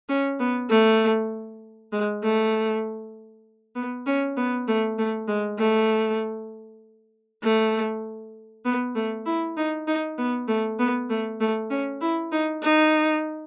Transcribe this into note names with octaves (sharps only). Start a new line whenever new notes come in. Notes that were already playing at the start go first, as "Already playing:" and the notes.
C#4
B3
A3
G#3
A3
B3
C#4
B3
A3
A3
G#3
A3
A3
B3
A3
E4
D#4
D#4
B3
A3
B3
A3
A3
C#4
E4
D#4
D#4